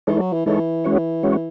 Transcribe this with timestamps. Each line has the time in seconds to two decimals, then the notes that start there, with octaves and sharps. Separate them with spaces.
0.07 E3 G#3 D#4 A4 C#5
0.19 F#3
0.33 E3
0.46 E3 G#3 D#4 A4 C#5
0.84 G#3 C#4 F#4 C#5
1.23 G#3 C#4 F#4 C#5